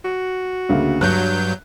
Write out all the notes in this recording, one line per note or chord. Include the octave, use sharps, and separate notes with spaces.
F#4
D2 C#3 A#3
G2 F#3 F#6 G6